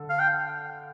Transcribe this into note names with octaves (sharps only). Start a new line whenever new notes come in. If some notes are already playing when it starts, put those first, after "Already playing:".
Already playing: D3 A4
F5
G5